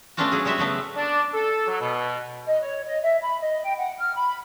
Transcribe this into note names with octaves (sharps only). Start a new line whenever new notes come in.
A3 B3 C#4 D4 F4 F#4
F#3 G#4
G3 G#3 F#4 E5
C#3 F#3 A3 B3
D4
A4
F#3
B2
D#5
C#5
D#5
E5
B5
D#5
G5
F#5
F6
B5